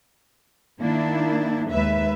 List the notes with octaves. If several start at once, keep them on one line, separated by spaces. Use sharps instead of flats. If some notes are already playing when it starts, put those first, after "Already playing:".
D#3 A#3 D4 E4
D#2 G#3 A#3 B4 E5